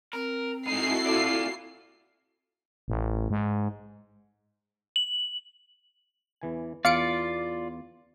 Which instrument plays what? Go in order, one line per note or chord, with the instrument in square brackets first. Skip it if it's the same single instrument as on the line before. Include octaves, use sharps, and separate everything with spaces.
[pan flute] C4 [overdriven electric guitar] A#4
[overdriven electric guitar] G#2 D#4 [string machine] E4 F#4 A4 [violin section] C7
[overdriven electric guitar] F4 D5
[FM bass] A1
G#2
[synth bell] F#7
[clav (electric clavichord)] E2 E3 G#5
[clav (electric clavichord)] E2 [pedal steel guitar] F4 D5 [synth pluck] F5 C#7 D7